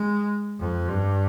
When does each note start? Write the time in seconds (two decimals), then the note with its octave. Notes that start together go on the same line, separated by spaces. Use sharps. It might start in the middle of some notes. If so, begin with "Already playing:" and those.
Already playing: G#3
0.60 F2
0.89 G2